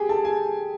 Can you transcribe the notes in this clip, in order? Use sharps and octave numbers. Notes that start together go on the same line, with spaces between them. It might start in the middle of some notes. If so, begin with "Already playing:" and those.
Already playing: G4 G#4 G5 G#5
A4 A5
G#4 G#5